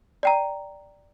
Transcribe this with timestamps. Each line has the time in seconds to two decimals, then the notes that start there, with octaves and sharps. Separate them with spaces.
0.23 D5 G5 A#5